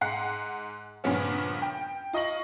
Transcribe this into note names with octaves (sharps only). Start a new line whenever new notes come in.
G#2 F#5 F#6 C7
G2 A#2 C#3 F3 B3 C#4
G5
F4 D#5 C#6 A#6 F#7